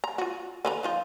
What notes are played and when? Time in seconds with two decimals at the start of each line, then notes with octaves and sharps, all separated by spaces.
0.04 A#5
0.18 F4 F#4
0.65 D3 B4 A#5
0.83 F3 D#4 F4